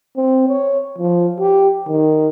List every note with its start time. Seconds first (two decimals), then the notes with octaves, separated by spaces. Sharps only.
0.17 C4
0.48 C#5
0.98 F3
1.40 G4
1.88 D#3